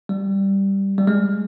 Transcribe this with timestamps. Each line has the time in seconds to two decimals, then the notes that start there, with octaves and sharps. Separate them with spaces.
0.09 G3
0.98 G3
1.07 G#3